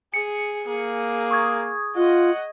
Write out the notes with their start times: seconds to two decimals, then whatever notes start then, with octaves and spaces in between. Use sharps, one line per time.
0.14 G#4 C#7
0.68 A#3 G#4
1.31 C#6 D#6 G#6
1.96 F4 D#5 F#5